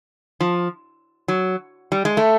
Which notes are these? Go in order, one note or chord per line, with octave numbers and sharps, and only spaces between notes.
F3
F#3
G3
G#3
A3